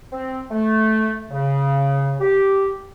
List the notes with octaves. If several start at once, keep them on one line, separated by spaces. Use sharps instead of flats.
C4
A3
C#3
G4